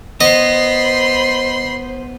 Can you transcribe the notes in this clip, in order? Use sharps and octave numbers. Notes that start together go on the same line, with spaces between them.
B3 C5 D#5 B5 C6